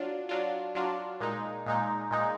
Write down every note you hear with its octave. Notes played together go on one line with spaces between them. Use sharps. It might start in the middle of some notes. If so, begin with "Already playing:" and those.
Already playing: F#3 D4 F4
F#3 D4 F4
F#3 D4 F4
A#2 G#3 D#4
A#2 G#3 D#4
A#2 G#3 D#4